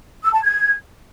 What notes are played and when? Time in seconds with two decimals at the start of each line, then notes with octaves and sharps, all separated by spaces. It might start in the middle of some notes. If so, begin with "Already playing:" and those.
0.24 E6
0.33 A5
0.42 G#6